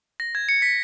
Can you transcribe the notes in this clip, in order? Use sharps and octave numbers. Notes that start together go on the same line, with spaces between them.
A#6
G#6
C#7
B6